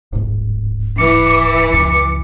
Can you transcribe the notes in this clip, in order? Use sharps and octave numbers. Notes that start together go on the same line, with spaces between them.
D1 G1 G#2
E3 D6 C#7
C#2 F#2 F3